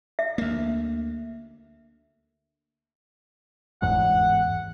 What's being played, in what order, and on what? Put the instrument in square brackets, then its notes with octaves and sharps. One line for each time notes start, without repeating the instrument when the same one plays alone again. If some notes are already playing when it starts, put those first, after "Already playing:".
[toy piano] E5
[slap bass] D2 A#3
[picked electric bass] G1 E2 G#2 [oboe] F#5